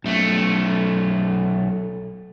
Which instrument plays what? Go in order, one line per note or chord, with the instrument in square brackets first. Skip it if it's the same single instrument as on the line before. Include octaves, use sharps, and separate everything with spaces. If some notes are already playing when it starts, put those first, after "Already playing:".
[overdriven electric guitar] B1 A3